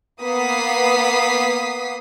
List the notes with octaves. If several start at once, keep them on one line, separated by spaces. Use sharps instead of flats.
A#3 B3 D#6 B6 C7